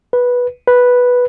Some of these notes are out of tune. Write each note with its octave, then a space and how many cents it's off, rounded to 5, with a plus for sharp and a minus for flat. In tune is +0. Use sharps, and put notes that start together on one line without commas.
B4 -10
B4 -5